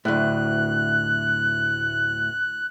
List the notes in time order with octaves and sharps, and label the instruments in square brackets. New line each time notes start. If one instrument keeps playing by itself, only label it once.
[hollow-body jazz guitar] D2 A2 [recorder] F#6